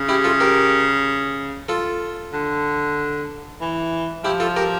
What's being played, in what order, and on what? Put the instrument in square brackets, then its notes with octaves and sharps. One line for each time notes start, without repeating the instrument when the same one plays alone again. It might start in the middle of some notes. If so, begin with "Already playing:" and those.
Already playing: [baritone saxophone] C#3
[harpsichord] E4 G4
F4 A4
G4 A#4
F4 A4
[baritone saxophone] D3
E3
[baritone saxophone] F3 [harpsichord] E4 G4
[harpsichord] F4 A4
G4 A#4